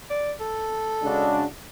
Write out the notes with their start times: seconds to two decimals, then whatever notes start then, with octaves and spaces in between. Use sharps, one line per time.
0.10 D5
0.40 A4
1.02 C#3 G#3 D4 F#4